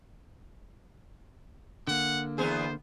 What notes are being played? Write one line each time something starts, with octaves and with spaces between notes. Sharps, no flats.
D3 A#3 F#5
E2 B3 G#4 C5